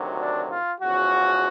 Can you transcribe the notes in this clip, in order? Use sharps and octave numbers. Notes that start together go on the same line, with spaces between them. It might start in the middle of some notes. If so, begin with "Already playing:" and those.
Already playing: D2 C3 D#3 F#3
D4
F4
E2 C#3 F3 F#4